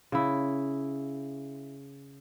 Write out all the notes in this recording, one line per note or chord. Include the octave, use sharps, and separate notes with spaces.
C#3 E4